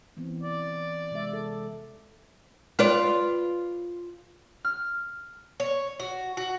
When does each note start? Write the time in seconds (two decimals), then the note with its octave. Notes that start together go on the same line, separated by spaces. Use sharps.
0.17 E3 B3 C4
0.43 D5
1.11 C3 G#3 E5
1.33 A4
2.79 F4 B4 D5
4.65 F6
5.60 C#5
6.00 F#4
6.37 F#4